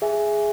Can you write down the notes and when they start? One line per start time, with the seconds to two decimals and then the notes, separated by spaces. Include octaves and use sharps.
0.02 G#4 E5 G#5